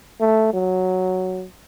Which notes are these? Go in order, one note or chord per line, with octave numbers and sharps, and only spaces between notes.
A3
F#3